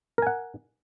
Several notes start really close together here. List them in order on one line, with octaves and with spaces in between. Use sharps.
A#4 G#5 F#5